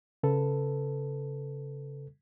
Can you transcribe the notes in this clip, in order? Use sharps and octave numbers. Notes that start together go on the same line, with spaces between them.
C#3 A4 B4